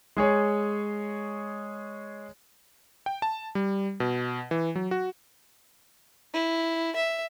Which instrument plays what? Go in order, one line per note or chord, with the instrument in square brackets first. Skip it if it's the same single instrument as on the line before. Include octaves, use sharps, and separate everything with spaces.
[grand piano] G#3 G#4 C#5
[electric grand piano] G5
A5
G3
B2
E3
F#3
F#4
[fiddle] E4
E5